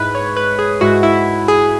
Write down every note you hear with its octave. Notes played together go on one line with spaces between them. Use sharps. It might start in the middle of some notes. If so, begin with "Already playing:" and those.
Already playing: G#2 G#3 E4 B4
C#5
B4
G#4
G#2 G#3 E4 F#4
E4
G#4